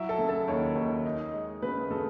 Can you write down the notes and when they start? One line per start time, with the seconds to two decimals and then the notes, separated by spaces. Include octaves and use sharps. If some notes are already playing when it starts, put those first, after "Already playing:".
Already playing: F#3 E4 E5
0.09 A4
0.18 C#3
0.29 A4
0.48 D#2 C#5
0.75 D#2
1.05 D#4
1.33 G#3
1.62 C#3 B4
1.90 C#3 A4